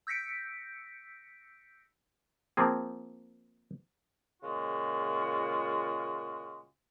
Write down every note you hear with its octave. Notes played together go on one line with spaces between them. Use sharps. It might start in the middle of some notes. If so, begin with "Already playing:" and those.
E6 G6 A#6 B6 C#7 D7
F3 A#3 C4 G#4
A#2 C#3 G#3 F4 F#4